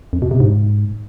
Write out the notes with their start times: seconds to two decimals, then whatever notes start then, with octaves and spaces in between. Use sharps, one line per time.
0.13 F2
0.22 B2
0.31 C3
0.40 G#2